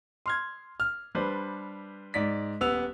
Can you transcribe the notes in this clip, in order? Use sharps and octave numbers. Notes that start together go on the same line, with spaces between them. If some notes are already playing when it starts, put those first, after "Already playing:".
C6 F6 G#6
F6
G3 D4 B4 C5
G#2 D5 B6
D#1 B3 E6 F7